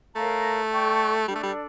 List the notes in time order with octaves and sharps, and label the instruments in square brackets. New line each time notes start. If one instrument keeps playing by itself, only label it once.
[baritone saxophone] A3 [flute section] A#4 C#5 F5 A#5
[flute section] A4 D5 G5 C#6
[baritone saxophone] G3 [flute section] D4 A4 D5
[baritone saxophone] A3
G3